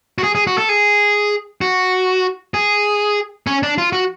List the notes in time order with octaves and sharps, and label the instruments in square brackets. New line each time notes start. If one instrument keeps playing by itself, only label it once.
[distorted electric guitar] F#4
G#4
G#4
F#4
A4
G#4
F#4
G#4
C#4
D4
F4
F#4